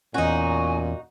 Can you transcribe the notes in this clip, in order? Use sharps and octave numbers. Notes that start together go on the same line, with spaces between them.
E2 A#2 C#4 D#4 F#4 G#5